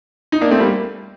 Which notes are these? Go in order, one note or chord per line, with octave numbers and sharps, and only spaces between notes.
D#4
A#3 D4
A3 C4
G3 A#3